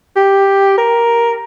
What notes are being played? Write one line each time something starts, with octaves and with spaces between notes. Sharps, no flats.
G4
A#4